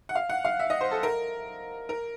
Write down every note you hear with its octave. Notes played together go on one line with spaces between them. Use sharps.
F#5
F5
F#5
F5
E5
D#5
C5
A4
A#4
A#4